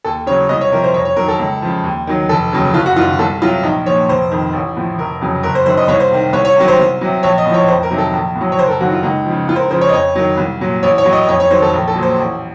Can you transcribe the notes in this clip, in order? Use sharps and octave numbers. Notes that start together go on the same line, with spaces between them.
D#2 A4
C#3 F#3 C#5
C2 D#5
C#5
C3 F3 A#4
C5
F2 C#5
C#5
D#3 F#3 A#4
A4
C#2
C#3 F3
D#2
D#3 F#3
F1 A4
D#2 C#3 F#3
F#1 F4
F#4
F#2 D#3 F4
C2 A4
C3 F#3 F4
A#1 D#4
A#2 F3 C#5
F1 C5
F2 D#3
A1
A2 F3
F1 A#4
F2 C#3 F#3
F#1 A#4
C5
F#2 D#3 C5
D#5
C2 C#5
C5
C3 D#3
C2 C#5
C#5
C3 D#3 F#3
C5
C2
C3 F#3
A#1 C#5
D#5
A2
F3 C#5
F2 C5
A#4
C3 D#3 F#3
A4
A#1
A2
F#3
C#5
F#1 C5
A#4
A4
F#2 D#3 F#3 F#4
F4
C#2 D#4
C#3 F3
C#2 F4
C5
A#4
C#3 F3 C5
C#5
D#5
F2 C#5
D#3 F#3
C2
A#2 F#3
A1 C#5
C#5
A2 F#3
D#5
F2 C#5
C#5
D#3 F#3 C5
A4
A#1
A4
A#2 F#3
C5
A1